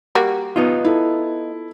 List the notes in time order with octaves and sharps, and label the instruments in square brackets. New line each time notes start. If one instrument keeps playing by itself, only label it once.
[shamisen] G3 A#3 F#4
[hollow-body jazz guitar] B3 D#4 F4
[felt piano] E4 A4